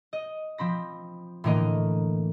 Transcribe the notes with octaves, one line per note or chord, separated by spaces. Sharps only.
D#5
F3 C4 B5 A#6
A2 D3 E3 A#3 A#4 D#5